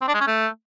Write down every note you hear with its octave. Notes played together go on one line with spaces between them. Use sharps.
C4
D4
G#3
C#4
A3